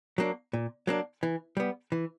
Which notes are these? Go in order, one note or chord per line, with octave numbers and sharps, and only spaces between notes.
F#3 A#3 D4
A#2
F#3 A#3 D4
E3
G3 B3
E3